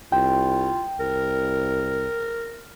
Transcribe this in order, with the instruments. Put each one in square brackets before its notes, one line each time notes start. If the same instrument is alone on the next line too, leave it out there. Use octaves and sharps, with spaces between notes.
[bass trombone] C2 [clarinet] F4 [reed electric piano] G5
[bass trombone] C2 [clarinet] A#4